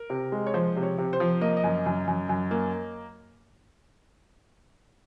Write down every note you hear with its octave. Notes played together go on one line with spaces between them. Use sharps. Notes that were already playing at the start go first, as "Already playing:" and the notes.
Already playing: A#4
C3
G#3
C#5
F3 C5
C3
C#5
C3
C5
F3
A#3 D#5
D#5
F#2
F#2
F#2
F#2
A#3